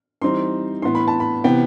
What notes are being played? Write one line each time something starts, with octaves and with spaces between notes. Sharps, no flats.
E3 G3 C4 D#4 C6
A2 E3 B3 C6
B5
A5
B5
C3 E3 B3 G5